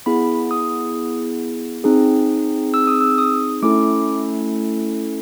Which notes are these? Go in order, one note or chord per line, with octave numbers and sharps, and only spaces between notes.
B3 E4 G#4 B5
D#6
C4 D#4 G#4
E6
D#6
E6
D#6
A3 C#4 E4 A4 D6